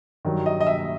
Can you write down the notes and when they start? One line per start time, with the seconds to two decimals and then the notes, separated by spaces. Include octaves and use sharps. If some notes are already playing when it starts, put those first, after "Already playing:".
0.25 G2 D#3 F#3
0.46 D#5
0.61 D#5
0.67 E5